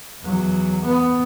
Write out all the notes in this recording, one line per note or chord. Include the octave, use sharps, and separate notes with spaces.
E2 F#3
B3